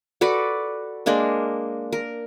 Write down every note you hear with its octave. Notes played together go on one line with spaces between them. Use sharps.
F#4 A4 B4 D5
G#3 A#3 D4 A#4
A#4